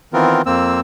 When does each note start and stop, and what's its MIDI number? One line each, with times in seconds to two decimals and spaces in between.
0.14 0.42 51
0.14 0.42 52
0.14 0.42 59
0.14 0.42 60
0.14 0.42 65
0.14 0.42 70
0.46 0.80 41
0.46 0.80 58
0.46 0.80 60
0.46 0.80 88